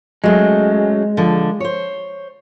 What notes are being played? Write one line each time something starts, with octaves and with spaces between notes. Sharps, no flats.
F#3 G#3 A3 C#4
D3 F3
C5 C#5